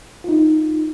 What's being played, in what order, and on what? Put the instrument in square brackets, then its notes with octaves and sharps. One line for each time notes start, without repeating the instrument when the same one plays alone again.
[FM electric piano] D#4 F4